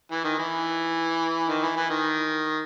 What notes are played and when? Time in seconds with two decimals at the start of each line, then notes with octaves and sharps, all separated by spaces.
0.12 E3
0.24 D#3
0.38 E3
1.48 D#3
1.63 E3
1.76 E3
1.90 D#3